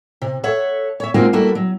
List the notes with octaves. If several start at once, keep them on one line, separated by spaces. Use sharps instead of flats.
C3
A4 C#5 E5 F#5
C#5 E5
G#3 A#3 C4 D#4 F4 F#4
G3 A#3 E4 F#4 A4
F#3